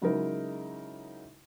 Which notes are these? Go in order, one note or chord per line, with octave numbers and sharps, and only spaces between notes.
C#3 F#3 G#3 D#4 E4 A#4